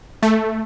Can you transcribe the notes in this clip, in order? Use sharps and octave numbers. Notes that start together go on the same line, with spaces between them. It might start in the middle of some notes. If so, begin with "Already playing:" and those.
A3